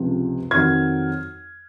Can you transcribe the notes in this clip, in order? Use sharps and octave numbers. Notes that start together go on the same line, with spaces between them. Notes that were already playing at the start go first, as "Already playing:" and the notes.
Already playing: C#2 C3 F3
F2 D#3 F#3 F6 G#6